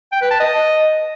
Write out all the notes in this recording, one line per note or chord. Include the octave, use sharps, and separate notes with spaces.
G5
B4
A5
D#5